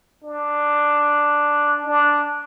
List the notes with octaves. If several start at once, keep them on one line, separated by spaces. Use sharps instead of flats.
D4
D4